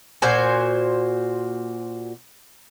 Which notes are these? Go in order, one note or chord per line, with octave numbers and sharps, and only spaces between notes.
A#2 F#4 C5 G#5